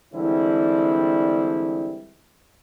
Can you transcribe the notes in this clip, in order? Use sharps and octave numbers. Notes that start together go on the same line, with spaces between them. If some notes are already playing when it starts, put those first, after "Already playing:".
D3 E3 G3 G#3 C4 E4